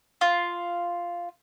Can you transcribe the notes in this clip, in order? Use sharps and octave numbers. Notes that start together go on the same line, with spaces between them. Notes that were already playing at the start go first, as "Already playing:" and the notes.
F4